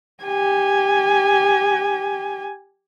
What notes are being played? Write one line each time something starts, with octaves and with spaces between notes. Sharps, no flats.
G4 G#5